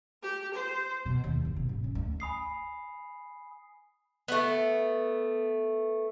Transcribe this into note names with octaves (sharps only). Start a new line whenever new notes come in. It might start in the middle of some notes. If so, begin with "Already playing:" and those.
G4
C5
B2
D#2
A#1
B2
G#1
C#4
D2
G#5 B5 D#6 C7
A3 B3